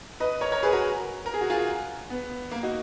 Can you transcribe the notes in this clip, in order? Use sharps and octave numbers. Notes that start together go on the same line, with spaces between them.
B4 D#5
A#4 C#5
A#4 C#5
G#4 B4
F#4 A#4
A#4
G#4
F#4
F4 G#4
B3
A#3
D#4 F#4